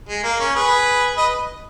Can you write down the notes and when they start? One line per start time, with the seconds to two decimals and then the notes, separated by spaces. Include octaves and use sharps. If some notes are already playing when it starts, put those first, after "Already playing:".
0.09 G#3
0.24 A#3
0.40 C#4
0.54 G#4 B4
1.17 B4 D#5